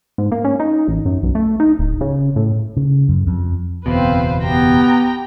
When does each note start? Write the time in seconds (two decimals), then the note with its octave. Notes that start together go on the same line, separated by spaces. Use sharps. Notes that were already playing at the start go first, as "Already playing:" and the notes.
0.18 G#2
0.32 A#3
0.45 C#4
0.60 D#4
0.88 A1
1.05 F#2
1.23 B1
1.35 A3
1.60 D#4
1.79 D1
2.01 C#3
2.36 A2
2.77 C#3
3.09 F#2
3.27 F2
3.86 F#1 E2 B2 C4 B4 C5 F5
4.43 B3 G4 G5 A#5